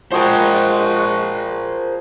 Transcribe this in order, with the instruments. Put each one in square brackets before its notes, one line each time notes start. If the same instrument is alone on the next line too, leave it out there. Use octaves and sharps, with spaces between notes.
[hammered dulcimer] F3 G#4 G5 [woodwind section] G#3 F#4 [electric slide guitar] A#4 C5